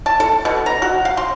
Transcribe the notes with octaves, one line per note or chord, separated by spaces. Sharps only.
A5
A4
B2
A#5
F#4
F5
C6